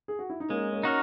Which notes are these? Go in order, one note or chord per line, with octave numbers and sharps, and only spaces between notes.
G#4
F#4
E4
D#4
G#3 A#3 C#4
A#3 C#4
C#4 D#4 F#4 A#4